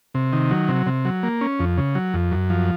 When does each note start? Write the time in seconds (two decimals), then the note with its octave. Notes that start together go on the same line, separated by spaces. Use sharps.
0.15 C3
0.33 D#3
0.51 F#3
0.69 C3
0.86 C3
1.05 F#3
1.23 A#3
1.41 C#4
1.59 F2
1.78 C#3
1.95 F#3
2.14 F2
2.32 F#2
2.50 F3